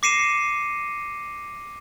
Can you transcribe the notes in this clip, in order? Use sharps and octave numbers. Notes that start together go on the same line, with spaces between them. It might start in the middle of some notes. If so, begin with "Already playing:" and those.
D6 A#6 C7 C#7 D#7 E7